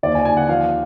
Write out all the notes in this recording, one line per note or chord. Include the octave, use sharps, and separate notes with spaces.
D#2 D5
G#5
D#2 G#5
F#5
F3 F5